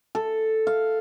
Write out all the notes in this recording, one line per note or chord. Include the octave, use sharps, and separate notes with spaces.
A4
F5